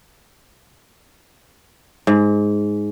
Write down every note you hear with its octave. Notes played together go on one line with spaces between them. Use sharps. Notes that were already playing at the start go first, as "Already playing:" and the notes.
G#2